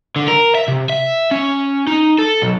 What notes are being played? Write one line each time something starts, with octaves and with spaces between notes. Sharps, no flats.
D3
A#4
E5
C3
E5
C#4
D#4
A4
B1